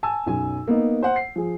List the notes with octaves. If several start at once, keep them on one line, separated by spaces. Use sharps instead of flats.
G#5 A5 E6
B1 F#2 G#5
A#3 B3 D#4
C5 F#5
C7
F3 G#4